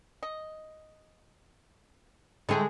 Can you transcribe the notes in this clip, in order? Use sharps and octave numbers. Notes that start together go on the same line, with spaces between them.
D#5
D3 G#3 A3 C4 D#4 G#4